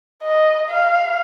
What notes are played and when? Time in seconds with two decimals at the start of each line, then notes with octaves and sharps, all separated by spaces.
0.23 D#5
0.69 F5